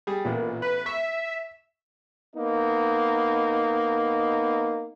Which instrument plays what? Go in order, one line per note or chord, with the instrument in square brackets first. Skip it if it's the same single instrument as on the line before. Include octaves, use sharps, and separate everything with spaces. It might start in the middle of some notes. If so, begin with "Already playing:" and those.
[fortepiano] G3 G#4
[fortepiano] A1 B3 [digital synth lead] A#2
[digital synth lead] B4
[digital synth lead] E5 [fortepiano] C#6
[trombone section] A#3 B3 D#4